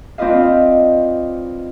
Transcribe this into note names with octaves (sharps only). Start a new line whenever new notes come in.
C4 D4 F4 B4 D#5 F5